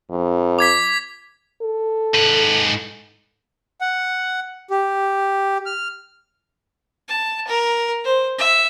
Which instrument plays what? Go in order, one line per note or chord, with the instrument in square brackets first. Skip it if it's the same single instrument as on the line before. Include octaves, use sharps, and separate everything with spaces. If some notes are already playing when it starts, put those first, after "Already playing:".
[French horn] F2
[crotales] D6 G#6 B6
[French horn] A4
[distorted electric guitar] G#2 B4
[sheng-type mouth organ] F#5
G4
F6
[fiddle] A5
A#4
C5
E5